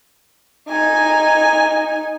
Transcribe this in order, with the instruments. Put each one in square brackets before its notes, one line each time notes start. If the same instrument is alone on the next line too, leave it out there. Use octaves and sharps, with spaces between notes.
[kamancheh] D#4 G#5